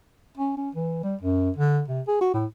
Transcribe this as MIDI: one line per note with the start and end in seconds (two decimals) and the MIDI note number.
0.38 0.53 61
0.57 0.70 61
0.75 1.03 52
1.04 1.15 55
1.22 1.50 42
1.57 1.81 50
1.88 2.01 48
2.08 2.19 68
2.21 2.31 66
2.34 2.46 45